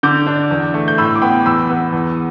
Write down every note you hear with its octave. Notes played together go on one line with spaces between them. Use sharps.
D3 D6 G6
D4
E2
A3
G6
A2 B5 E6
D6
B3 G5 B5
E2 B5 E6
B3
E2